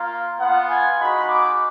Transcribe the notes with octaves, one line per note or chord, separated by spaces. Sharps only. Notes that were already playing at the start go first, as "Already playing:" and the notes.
Already playing: A#3 F4
B3 F4 F#5
G#5
G#3 D#4 F#4 B5
D6